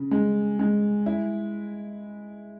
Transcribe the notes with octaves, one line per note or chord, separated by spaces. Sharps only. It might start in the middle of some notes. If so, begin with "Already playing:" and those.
Already playing: C#3
G#3
G#3
E4